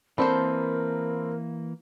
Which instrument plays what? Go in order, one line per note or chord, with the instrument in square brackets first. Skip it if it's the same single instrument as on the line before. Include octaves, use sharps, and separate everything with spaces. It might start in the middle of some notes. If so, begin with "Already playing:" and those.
[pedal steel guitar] E3 A#3 [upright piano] C4 B5 [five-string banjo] D4 A4 C5 [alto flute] A#4